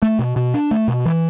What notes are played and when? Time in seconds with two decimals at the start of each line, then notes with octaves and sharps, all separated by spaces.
0.02 A3
0.19 B2
0.36 B2
0.54 D4
0.71 A3
0.88 B2
1.06 E3